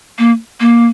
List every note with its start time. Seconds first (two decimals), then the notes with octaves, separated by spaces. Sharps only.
0.19 A#3
0.60 A#3